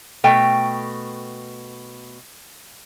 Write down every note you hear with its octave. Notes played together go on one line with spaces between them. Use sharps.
B2 A3 G5